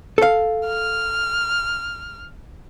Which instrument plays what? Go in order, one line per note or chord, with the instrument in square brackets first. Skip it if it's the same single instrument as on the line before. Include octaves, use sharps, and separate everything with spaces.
[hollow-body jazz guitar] A4 F5
[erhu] F6